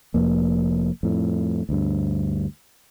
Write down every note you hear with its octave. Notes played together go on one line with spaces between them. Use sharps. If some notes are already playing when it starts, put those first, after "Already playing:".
F1 F2 A#3
F2 A2
D2 G2